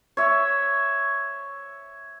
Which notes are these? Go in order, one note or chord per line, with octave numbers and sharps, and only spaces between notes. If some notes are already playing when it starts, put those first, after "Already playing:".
C#5 E5